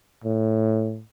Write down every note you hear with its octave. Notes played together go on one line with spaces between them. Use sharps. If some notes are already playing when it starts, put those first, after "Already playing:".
A2